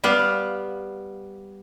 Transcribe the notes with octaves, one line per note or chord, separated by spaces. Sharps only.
G3 B3 F5